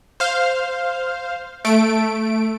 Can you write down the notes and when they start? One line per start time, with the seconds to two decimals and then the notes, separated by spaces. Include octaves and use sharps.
0.20 C5 F5
1.65 A3 D7